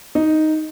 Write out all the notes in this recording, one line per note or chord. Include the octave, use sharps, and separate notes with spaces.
D#4